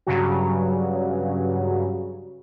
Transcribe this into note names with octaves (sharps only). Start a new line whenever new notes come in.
G2 C#3 F#3